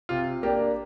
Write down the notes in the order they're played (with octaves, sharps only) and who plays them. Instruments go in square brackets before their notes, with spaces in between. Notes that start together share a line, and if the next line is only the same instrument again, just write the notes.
[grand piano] C3 F4
A#3 D4 G4